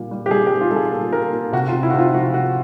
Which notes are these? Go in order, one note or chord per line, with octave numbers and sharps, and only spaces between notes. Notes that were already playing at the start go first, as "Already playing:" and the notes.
Already playing: A#2 G3
G3
G4
G3 G#4
G4
C4
F4
G3 A4
G#4
A#2 A4
A#2 A#4
A#2
C3 F#4
F4
C3
E4
F#4
C3 F4
F3 F#4
C3 F#4